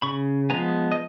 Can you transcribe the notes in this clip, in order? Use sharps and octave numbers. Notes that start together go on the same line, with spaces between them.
C#3 B5 C#6
F3 G#3 B3 G#5 A#5
D#5